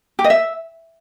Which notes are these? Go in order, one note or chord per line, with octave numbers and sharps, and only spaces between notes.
G4
D#5
E5